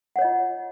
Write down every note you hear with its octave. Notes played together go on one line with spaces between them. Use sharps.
F4 C#5 D#5 F#5